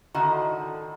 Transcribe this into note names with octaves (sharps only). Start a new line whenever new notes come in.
A2 D3 D#3 F#4 D#5